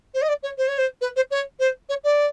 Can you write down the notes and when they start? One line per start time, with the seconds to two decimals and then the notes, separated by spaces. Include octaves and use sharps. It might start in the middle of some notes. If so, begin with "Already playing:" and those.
0.14 C5
0.22 D#5
0.28 D5
0.43 C#5
0.58 C5
0.68 C#5
0.78 C5
1.01 B4
1.16 C5
1.31 C#5
1.59 C5
1.89 C#5
2.04 D5